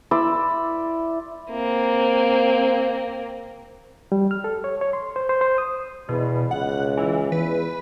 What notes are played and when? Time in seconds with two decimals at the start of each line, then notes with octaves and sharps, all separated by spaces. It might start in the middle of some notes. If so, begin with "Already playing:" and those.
0.11 E4 D5 C6 E6
1.51 A#3 C4
4.12 G3
4.31 F6
4.44 A4
4.64 C#5
4.81 C#5
4.93 C6
5.16 C5
5.29 C5
5.41 C5
5.58 D#6
6.09 E2 B2
6.51 C#2 F#5
6.97 E3
7.32 E2 B4